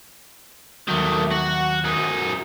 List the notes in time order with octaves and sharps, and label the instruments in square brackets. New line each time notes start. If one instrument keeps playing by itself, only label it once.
[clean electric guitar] D#2 F#3 [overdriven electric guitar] D#3 A3
[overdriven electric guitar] F#4
F#2 D#4